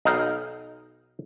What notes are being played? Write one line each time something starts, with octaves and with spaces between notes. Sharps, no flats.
B1 D#4 F5